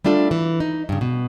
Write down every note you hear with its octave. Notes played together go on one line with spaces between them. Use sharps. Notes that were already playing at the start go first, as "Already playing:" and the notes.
G3 A3 D4 F4 A4
E3
D#4
G2 C#3
B2